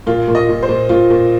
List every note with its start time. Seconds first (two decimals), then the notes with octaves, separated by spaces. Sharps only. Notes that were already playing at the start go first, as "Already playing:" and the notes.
0.06 A#2 F4
0.28 A#2
0.35 D#5
0.49 A#2
0.63 C5
0.69 A#2
0.89 A#2 F4
1.10 A#2